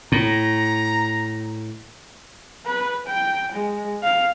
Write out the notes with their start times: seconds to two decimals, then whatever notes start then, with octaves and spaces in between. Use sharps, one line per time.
0.12 A2 A#5
2.66 B4
3.07 G5
3.52 G#3
4.03 F5